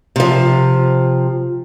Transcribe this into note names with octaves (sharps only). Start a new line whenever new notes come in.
C3 F3